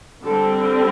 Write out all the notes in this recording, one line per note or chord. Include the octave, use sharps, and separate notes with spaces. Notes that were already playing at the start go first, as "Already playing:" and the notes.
D3 G3 C4 A4